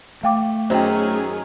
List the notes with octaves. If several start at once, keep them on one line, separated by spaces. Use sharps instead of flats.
A3 F5 G5 D6
F#2 D#3 C#4 G#4 C5 G5